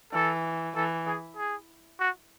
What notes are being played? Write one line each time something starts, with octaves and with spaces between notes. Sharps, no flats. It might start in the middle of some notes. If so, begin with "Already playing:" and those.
E3 A4
E3 A4
G#4
G#4
F#4